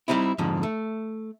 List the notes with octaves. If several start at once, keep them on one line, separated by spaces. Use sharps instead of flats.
G3 G#3 C4 D#4 E4
F2 G#2 D3 F3
A3